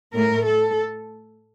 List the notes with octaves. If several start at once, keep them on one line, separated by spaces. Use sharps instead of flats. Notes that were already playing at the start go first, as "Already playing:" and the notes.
A2 A3 A#4
A4